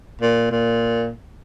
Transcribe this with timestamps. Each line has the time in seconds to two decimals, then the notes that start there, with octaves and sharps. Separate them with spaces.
0.21 A#2
0.51 A#2